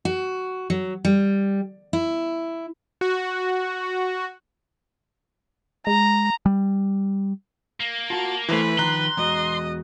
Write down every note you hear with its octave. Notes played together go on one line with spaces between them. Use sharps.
F#4
F#3
G3
E4
F#4
G#3 A#5
G3
A#3
F4 F#4 A5
E3 A3 E4 B4 C5
D#3 F3 A#5 C6 F#6
E2 G#3 F#4 D#5